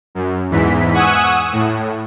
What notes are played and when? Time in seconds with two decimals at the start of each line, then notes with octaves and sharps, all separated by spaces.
0.15 F#2
0.50 E2 G#2 E3 B6
0.94 F#5 G#5 C#6 D#6 E6 F#6
1.52 A2